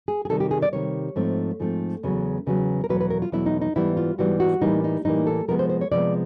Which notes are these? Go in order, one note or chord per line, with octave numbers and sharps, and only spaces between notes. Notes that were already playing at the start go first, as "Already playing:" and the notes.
G#4
G#4
C3 D#3 G3 A4
G4
G#4
D5
C3 D#3 G3 C#5
G#2 F3 A3 C4
G#2 F3 A3 C4
E2 C#3 F#3 B3
E2 C#3 F#3 B3
A#4
E2 B2 F#3 A3 B4
B4
A#4
F4
E2 B2 F#3 A3 E4
D#4
D#4
G#2 E3 G3 B3 E4
F4
G#2 E3 G3 B3 F#4
F#4
A2 E3 G3 A#3 D#4
D#4
A2 E3 G3 A#3 D#4
A4
C3 F3 G#3 B3 A#4
C5
C5
C#5
C3 F3 G#3 B3 D5